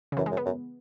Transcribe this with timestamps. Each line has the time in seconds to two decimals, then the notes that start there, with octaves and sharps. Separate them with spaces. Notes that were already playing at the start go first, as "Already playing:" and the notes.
0.12 C#3
0.17 F#2 E3
0.26 G#3
0.31 F#2
0.37 B3
0.46 F#2